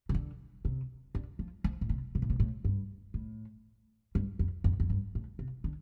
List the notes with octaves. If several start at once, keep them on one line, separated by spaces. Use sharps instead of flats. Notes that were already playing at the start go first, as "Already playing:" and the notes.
C3
D3
C3
D3
F3
F3
A2
C3
C3
A2
C3
A2
G2
A2
G2
F2
F2
F2
G2
A2
C3
D3